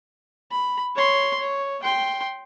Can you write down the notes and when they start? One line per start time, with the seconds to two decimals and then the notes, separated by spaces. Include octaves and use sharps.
0.51 B5
0.96 C#5 C6
1.40 C#5
1.83 G5 C6